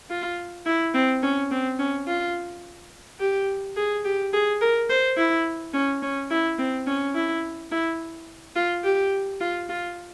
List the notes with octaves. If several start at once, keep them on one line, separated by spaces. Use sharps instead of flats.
F4
E4
C4
C#4
C4
C#4
F4
G4
G#4
G4
G#4
A#4
C5
E4
C#4
C#4
E4
C4
C#4
E4
E4
F4
G4
F4
F4